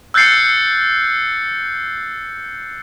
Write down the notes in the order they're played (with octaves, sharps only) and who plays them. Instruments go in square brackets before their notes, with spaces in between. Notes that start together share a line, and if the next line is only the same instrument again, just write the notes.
[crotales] E6 F#6 G6 A6 C7 C#7